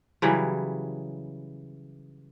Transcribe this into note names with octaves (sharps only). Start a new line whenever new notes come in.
C#3 E3 F#3 G3